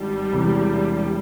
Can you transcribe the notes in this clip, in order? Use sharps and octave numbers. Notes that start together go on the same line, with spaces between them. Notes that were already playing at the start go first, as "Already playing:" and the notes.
Already playing: G#1 G2 D#3 G3
E1 E2 C3 E3